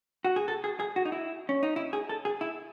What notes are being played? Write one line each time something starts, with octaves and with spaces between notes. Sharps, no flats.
F#4
G#4
A4
G#4
G#4
F#4
D#4
E4
C#4
D#4
E4
G#4
A4
G#4
E4